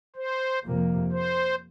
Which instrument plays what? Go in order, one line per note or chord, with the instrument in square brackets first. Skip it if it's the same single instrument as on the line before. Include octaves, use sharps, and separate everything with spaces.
[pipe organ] C5
[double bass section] F2 C3 F3 A#3
[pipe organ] C5